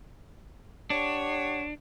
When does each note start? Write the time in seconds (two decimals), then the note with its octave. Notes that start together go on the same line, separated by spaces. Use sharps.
0.90 D4 G4 C#5 F#5